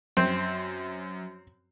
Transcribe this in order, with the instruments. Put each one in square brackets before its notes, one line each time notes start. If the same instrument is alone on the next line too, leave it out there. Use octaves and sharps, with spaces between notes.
[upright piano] F#2 [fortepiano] C4